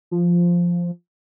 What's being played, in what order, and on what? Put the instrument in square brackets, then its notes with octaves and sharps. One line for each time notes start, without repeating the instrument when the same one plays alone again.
[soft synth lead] F3